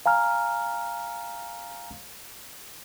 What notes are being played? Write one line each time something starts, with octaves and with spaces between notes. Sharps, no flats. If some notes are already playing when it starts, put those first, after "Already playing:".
F5 G#5 A#5 F6